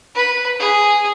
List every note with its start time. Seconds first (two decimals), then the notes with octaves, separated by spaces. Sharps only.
0.14 B4
0.59 G#4